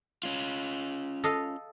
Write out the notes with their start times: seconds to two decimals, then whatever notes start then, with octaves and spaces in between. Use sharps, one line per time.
0.23 C#4 F4
1.24 A4 D#5 F5